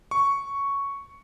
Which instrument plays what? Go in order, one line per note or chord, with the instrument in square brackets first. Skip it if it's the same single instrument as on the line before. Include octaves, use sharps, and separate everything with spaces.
[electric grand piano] C#6